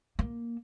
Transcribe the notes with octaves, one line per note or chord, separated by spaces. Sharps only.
A#3